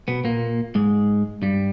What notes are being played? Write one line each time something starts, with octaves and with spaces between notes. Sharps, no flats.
B2 B3
A#2 A#3
G#2 G#3
G2 G3